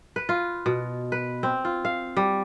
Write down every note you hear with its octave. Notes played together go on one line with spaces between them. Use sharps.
B4
F4
B2
B4
C4
F4
F5
G3